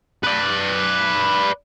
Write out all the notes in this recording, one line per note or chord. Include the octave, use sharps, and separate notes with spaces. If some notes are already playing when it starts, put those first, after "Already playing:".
B4 D5